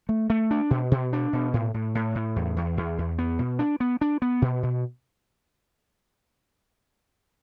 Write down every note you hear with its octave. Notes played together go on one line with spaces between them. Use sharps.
A3
A3
D4
B2
B2
D4
B2
A2
A2
A2
A2
E2
E2
E2
E2
B3
B2
D4
B3
D4
B3
B2
B2